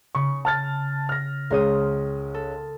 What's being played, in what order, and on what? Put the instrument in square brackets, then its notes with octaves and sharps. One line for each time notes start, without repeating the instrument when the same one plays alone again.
[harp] C#3 [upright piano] C#6
[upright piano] A5 F6 A6
F6 A#6
[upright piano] C#2 G#3 C#4 [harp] A#4 C5 D#6
[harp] A4